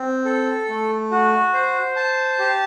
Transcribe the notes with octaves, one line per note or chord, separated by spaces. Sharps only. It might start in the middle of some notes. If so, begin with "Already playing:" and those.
Already playing: C4
A4
A3
F#4
C5
A5
G4